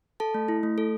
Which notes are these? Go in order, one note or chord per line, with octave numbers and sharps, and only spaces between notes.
A4 A5
A3
E4
A3
A4